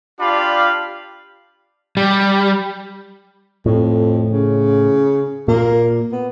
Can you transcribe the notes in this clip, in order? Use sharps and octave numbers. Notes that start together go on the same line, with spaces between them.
D4 F4 G4 D5 F5 B5
G3
F2 A2
C#3
A#2 A#3
B3